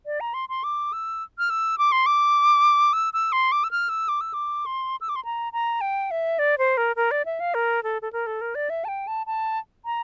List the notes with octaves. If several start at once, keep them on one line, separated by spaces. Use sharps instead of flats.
D5
A#5
C6
C6
D6
E6
F6
E6
D6
C6
D6
E6
E6
C6
D6
E6
F6
E6
D6
E6
D6
C6
E6
D6
C6
A#5
A#5
G5
E5
D5
C5
A#4
A#4
D5
E5
F5
A#4
A4
A4
A#4
A4
A#4
D5
E5
A5
G5
A5
A5
A#5